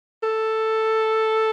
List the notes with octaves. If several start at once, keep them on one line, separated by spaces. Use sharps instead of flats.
A4